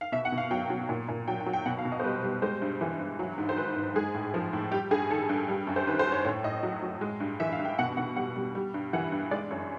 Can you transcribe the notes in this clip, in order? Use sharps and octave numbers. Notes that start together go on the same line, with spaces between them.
F5
B2 E5
F#5
B2
F5
F#3 G5
F#3
A#2
A#2
F#3 G5
G5
F#3
G5
B2 F#5
F5
B2
D#5
C5
G3 B4
G3
G#3 C5
G2
E3
G2
F#3
G#2
C5
D#3 B4
G#2
G#3 G#4
A2
F3
A2
G3 G4
G2 G#4
D#3 A4
G2
G3
F#2
C5
D#3 B4
C5
F#2
C#5
A2 C#5
A2 D#5
F#3
F#3
G#3
G2
E3 E5
F5
G2
G5
B2 F#5
B2 F#5
G3 F#5
G3
G3
G2
E3 F#5
G2
G#3 D5
F#2 C#5